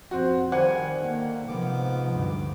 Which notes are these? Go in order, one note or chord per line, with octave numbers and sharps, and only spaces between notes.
F2 C4 F#4
D#3 G3 C5 F#5 G#5
D3 D#3 A#3
G#2 C3 F3 B3 D6
D2 G2